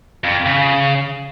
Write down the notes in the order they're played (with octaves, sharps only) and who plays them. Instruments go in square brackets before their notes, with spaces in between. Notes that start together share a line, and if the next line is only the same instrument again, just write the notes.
[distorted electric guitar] F2
C#3